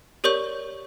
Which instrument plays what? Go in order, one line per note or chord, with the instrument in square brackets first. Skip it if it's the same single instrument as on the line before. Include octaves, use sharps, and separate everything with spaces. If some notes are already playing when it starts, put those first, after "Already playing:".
[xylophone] G4 A#4 C#5 D5 C#6 G6